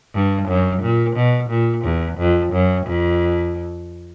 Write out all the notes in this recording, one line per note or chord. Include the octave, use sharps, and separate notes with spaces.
G2
F#2
A#2
B2
A#2
E2
F2
F#2
F2